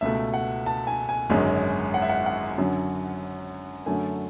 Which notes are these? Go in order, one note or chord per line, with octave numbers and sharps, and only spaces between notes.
C#2 B2 A3 E5
F#5
A5
G#5
G#5
G#1 F#2 D3 G#3 C#4
F#5
E5
F#5
F#5
F#2 D3 F#3
F#2 D3 F#3 A3 G#5